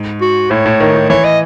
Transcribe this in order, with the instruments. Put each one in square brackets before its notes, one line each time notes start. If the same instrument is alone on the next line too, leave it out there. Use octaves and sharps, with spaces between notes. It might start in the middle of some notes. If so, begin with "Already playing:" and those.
Already playing: [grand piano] G#2
[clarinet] F#4
[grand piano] A2 [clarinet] C#5
[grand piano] A2
D#3
D#3
[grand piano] E3 [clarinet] C#5
[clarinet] D#5